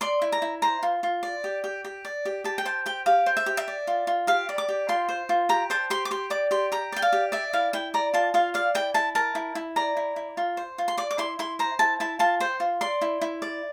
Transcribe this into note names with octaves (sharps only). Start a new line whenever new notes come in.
D5 C6
E4
A#5
E4
C5 A#5
F4
F4
D5
G4
G4
G4
D5
G4
G4 A5
G5
C5 A5
G4 G5
G4 F5
C5
E5
G4
E5
D5
F4
F4
G4 F5
D5
D6
G4
F4 C6
C5
F4
G4 A#5
C5 A5
G4 C6
D6
G4 C6
D5 D6
G4 C6
G4 A#5
D5 G5
F5
G4
D5 E5
E4 F5
E4 G5
D5 A#5
F4 A5
F4 F5
D5 F5
E4 G5
E4 A5
A#4 A5
E4
E4
D5 A#5
E4
E4
F4
C5
F4
C6
D5 D6
D6
E4 C6
E4 C6
C5 A#5
E4 A5
E4 A5
F4 A5
C5 G5
F4
D5 C6
E4
E4
D5